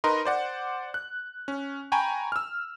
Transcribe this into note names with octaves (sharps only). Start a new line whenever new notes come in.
D#4 A#4 B4 D#5 C6
C5 D5 F#5
F#6
C#4
G5 G#5 A#5 B5 C#6
E6 F6